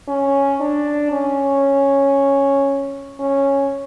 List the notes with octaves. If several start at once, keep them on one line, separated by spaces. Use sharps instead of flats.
C#4
D4
C#4
C#4